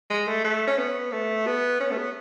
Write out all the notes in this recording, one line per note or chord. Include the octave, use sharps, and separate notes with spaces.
G#3
A3
A3
C#4
B3
A3
B3
C#4
A3
B3